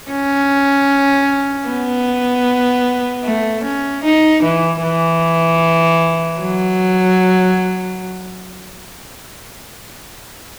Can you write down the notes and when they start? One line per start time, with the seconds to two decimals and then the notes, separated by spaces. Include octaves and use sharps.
0.11 C#4
1.68 B3
3.25 A3
3.64 C#4
4.04 D#4
4.43 E3
4.83 E3
6.40 F#3